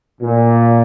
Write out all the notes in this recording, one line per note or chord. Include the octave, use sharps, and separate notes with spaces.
A#2